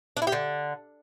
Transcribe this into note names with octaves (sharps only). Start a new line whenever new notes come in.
D4
E4
G4
D3